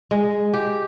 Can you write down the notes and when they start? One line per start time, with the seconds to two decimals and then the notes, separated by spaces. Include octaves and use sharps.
0.11 G#3
0.54 G4